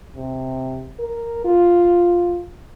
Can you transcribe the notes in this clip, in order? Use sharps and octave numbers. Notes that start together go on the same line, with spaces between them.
C3
A#4
F4